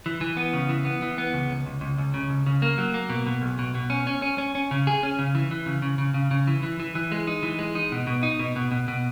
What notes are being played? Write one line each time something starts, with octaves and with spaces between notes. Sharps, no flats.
E3
E3
B3
C#3
E3
B3
E3
B3
C#2
C#2
C#2
C#2
C#2
C#3
C#2
C#3
A#3
F#3
A#3
B2
B2
B1
B2
B2
C#4
C#4
C#4
C#4
C#4
C#3
G#4
C#4
C#3
E3
E3
C#3
C#3
C#3
C#3
C#3
E3
E3
E3
E3
G#3
D#4
E3
G#3
D#4
B2
B2
D#4
B2
B2
B2
B2